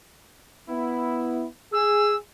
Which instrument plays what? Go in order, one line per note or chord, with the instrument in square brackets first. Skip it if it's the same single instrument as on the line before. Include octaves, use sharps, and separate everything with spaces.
[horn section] B3 E4
[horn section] G#4 [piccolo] E6